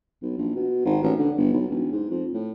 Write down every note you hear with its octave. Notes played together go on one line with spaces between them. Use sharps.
B1
A#1
B2
G#1
A1
D3
G1
B1
E1
G#2
F2
A2